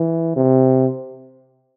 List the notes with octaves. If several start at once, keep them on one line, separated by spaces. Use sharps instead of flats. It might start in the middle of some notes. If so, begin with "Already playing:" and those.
Already playing: E3
C3